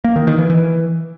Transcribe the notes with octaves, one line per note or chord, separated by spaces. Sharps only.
A#3
D#3
D#3
E3
E3